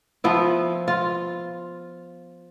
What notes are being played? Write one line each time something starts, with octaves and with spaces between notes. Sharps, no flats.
F3 B3 E4
F4